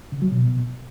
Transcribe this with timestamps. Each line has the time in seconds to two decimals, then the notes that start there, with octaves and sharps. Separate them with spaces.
0.12 C#3
0.22 F#3
0.31 B2